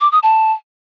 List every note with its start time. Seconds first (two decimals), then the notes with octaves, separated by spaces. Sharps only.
0.01 D6
0.12 D#6
0.23 A5